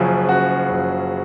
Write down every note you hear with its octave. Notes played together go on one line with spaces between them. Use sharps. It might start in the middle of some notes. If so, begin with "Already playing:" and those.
Already playing: F#1 F#2 C#3 F3 G#4
F#1 F#4
F#2 C#3 F3